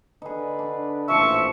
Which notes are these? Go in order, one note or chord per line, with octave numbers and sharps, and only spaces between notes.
D3 D#4 G#4 B4
D4
A1 A#2 F3 E5 C#6